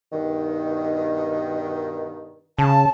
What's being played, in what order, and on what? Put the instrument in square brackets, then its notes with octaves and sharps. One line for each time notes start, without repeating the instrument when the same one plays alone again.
[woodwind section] G2 B2 D#3
[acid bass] C#3 [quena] A5